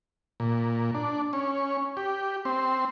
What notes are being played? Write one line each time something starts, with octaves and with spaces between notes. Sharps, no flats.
A#2
D4
C#4
G4
C4